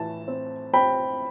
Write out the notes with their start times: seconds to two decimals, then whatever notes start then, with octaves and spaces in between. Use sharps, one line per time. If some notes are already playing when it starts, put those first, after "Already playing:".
Already playing: A2 E3 A5
0.28 C4
0.73 C4 G5 B5